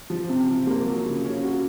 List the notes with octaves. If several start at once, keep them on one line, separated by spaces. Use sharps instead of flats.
F3
C3
F3
A#3
F#3
C#3
C#4
F#4